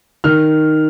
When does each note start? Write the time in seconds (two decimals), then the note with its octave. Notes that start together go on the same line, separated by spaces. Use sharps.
0.24 D#3 F6